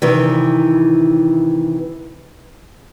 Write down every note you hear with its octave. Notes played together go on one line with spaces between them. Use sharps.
C3 D#3 E3